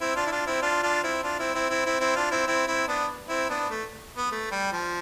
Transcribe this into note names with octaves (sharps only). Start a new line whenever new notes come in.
C4 E4
D4 F4
E4
D4 F4
C4 E4
D4 F4
D4 F4
C4 E4
D4 F4
C4 E4
C4 E4
C4 E4
C4 E4
C4 E4
D4 F4
C4 E4
C4 E4
C4 E4
B3 D4
C4 E4
B3 D4
A3
B3
A3
G3
F3